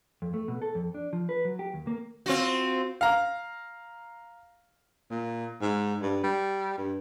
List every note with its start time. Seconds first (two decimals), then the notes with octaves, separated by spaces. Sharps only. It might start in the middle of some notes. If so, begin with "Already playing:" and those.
0.22 F2
0.34 A3
0.48 B2
0.62 A4
0.75 F2
0.94 D4
1.13 F3
1.29 B4
1.45 F#3
1.59 G4
1.74 D#2
1.87 A#3
2.26 C4 F4 F#4
3.01 F5 A#5
5.11 A#2
5.61 G#2
6.02 G2
6.23 G3
6.78 G2